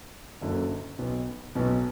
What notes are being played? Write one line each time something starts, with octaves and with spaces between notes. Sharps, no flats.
F#1 F#2 D3 F#3 A#3
B1 B2 F#3 B3
B1 B2 F#3 B3